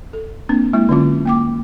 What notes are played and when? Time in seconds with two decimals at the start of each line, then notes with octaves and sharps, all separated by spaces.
0.13 A4
0.49 A#3 C4 D4
0.73 G#3 A#3 E4
0.89 D3 F#3 C#4 F4
1.26 A#3 G5 D6